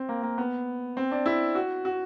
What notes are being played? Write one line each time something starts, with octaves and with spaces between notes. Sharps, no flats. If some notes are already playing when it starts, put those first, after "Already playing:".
Already playing: C4
A#3
A#3
B3
C4
D4
E4
F#4
F#4